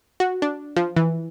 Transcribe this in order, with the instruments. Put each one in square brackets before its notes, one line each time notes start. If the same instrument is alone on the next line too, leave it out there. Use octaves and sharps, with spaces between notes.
[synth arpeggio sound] F#4
D4
F3
E3